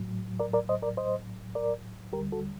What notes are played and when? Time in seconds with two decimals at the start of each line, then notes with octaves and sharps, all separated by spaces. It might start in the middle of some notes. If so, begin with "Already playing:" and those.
Already playing: A2 F#3
0.40 A#4 D5
0.54 A#4 D5
0.69 C5 D#5
0.82 A#4 D5
0.97 C5 D#5
1.55 A#4 D5
2.13 D#2 D3 G3 G4 A#4
2.32 F#4 A4